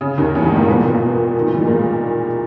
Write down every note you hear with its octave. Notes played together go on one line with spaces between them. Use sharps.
C#3
D#2 D#3
E2 E3
G2 G3
G#2 G#3
A#2 A#3
B2 B3
A#2 A#3
B2 B3
A#2 A#3
D#3
E3
G3
G#3
A#2 A#3